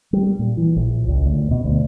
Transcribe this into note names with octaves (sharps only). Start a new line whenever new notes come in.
G3
A#2
E3
A#1
C#2
D2
B2
D2